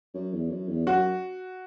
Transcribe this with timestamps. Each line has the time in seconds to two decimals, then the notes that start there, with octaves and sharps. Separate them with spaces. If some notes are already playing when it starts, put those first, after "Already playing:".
0.14 F#2
0.33 E2
0.50 F#2
0.68 E2
0.86 F#2 F#4